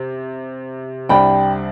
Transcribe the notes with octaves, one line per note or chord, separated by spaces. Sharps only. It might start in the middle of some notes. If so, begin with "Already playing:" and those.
Already playing: C3
C2 C3 G3 D4 G5 B5